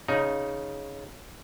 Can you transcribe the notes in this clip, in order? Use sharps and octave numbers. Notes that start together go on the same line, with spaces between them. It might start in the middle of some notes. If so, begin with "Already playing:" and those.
C#3 D#4